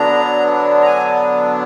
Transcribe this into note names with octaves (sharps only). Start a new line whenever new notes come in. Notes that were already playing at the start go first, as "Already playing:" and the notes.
Already playing: D3 F#3 B3 D4 A#5
A#5
G#5